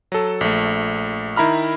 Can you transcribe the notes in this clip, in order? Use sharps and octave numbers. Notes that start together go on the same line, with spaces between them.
F#3 A4
A#1 A3
D#3 E4 A#5 B5 F6